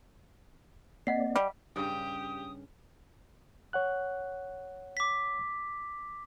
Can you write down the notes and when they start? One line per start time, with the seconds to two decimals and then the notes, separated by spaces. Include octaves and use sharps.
1.07 A#3 C4 D5 D#5 F#5 C7
1.36 G3
1.76 G2 C#3 G4 G5 D#6
3.73 C#5 F#5 F#6
4.97 D6 B6